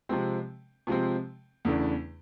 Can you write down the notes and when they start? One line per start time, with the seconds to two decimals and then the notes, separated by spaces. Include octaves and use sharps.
0.09 C3 F3 G#3 C4
0.87 C3 F3 G#3 C4
1.65 E2 C#3 E3 A3 D4